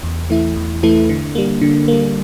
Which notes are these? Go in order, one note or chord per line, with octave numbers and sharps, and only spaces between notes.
E2
E3 A3 E4
E2
E3 A3 E4
D3
G3 A#3
D3
G3 A#3